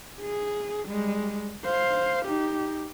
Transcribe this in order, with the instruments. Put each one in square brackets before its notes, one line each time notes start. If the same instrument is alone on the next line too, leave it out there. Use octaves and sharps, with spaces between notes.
[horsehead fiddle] G#4
G3 G#3
C5 F5
D#4 G4